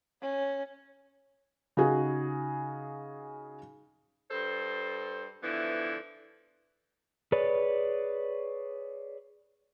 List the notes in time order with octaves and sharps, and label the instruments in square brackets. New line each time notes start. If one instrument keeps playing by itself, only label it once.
[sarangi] C#4
[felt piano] C#3 D#4 F#4 G#4
[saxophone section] G2 A4 C5
D3 E3 F3 B3 E4
[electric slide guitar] G#4 B4 C#5 D5